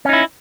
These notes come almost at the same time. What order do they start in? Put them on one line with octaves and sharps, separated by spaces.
C#4 D#4 E4